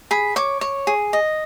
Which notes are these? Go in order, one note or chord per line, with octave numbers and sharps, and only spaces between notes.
G#4 B5
C#5 D6
C#5
G#4
D#5